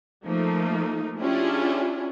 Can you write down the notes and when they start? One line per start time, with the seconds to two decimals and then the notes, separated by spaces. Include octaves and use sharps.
0.25 F3 A3 A#3 D#4
1.19 C#4 D4 E4 F4 G4 G#4